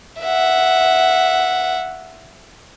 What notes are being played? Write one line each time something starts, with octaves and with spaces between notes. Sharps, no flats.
E5 F#5